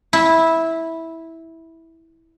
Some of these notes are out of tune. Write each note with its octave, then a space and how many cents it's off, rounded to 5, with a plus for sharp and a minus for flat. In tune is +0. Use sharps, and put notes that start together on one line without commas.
E4 -10